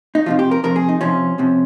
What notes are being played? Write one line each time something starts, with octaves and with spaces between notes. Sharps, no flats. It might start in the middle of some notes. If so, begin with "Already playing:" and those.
D#4
F2 C3 F3 F4
G4
A#4
F2 C3 F3 A#4
G#4
D#4
F2 C3 F3 C#4
F2 C3 F3